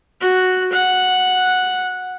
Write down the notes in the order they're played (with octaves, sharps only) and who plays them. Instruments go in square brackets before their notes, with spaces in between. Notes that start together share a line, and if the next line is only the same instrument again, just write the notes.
[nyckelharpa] F#4
F#5